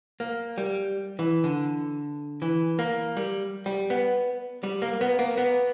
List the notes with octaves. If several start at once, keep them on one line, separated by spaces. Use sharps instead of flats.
A#3
G3
E3
D3
E3
A#3
G3
G3
B3
G3
A#3
B3
A#3
B3